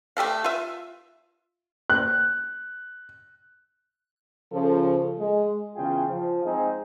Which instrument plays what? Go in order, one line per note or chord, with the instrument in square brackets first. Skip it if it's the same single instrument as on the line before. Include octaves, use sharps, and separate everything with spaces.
[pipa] A3 G4 A4 F5
F4 E5
[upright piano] F#6
[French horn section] C#3 F3 A4
G#3
[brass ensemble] E2 C#3 F4 G#4 G5
F3
G#3 C4 D#4 G#4